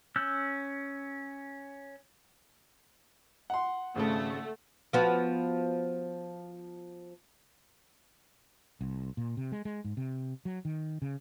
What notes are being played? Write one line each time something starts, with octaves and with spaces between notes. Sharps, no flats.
C#4 E6 F#6 G6
F#5 C6
G#1 C#3 A3 A4
F3 B3 F#4
C2
A#2
C3
G#3
G#3
G#2
C3
F#3
D#3
C#3